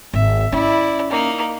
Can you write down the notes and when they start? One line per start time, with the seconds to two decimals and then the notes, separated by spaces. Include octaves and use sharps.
0.14 G#1 E5
0.52 C#4 E4 D5
1.10 A#3 D#4